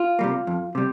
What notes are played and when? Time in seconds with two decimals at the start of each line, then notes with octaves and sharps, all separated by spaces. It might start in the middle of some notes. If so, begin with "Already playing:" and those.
Already playing: F4
0.19 C3 G3 A#3
0.47 F2
0.75 C3 G3